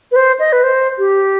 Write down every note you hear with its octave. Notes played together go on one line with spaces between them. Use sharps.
B4
C5
D#5
B4
C5
G4